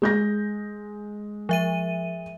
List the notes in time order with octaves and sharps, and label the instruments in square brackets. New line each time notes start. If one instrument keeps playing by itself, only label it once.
[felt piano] G#3 G6 A#6
[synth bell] F3 E5 D#7